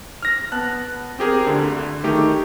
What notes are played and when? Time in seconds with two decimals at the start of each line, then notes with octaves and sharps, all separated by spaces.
0.23 F6 A#6
0.52 B3 A5 F#6
1.19 C4 G4 G#4 A#4
1.47 D2 D3
2.04 D#3 A3 D#4 G4 G#4